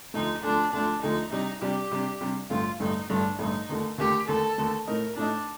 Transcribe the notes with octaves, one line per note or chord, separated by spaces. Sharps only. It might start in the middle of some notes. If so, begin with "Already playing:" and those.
D2 D3 F3 A3 D#4
D2 D3 F3 A3 D4
D2 D3 F3 A3 D4
D2 D3 F3 A3 D#4
C3 G3 D4 D#4
C3 G3 D4 G4
C3 G3 D4
C3 G3 D4
A1 G2 D3 A3 F4
A1 G2 D3 A3 D#4
A1 G2 D3 A3 D4
A1 G2 D3 A3 D#4
D#2 D3 A3
D#2 D3 A3 G4
D#2 D3 A3 A4
D#2 D3 A3
A2 A3 D#4 A#4
A2 A3 D4 D#4